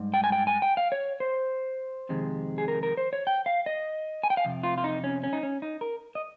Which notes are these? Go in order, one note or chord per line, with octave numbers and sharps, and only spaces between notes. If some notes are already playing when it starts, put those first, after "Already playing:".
Already playing: G#2 G3
G5
G#5
G5
G#5
G5
F5
C#5
C5
F2 C3 D#3 G#3
G#4
A#4
A#4
C5
C#5
G5
F5
D#5
G#5
G5
F5
F2 C3
F4
F4
D#4
C#4
C#4
D#4
C#4
D#4
A#4
D#5